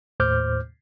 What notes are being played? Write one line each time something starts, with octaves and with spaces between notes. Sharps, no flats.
D#2 A2 C5 D6 F6 G6